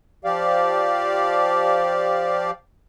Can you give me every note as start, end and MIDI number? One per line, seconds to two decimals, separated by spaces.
0.25 2.51 53
0.25 2.51 67
0.25 2.51 74
0.25 2.51 77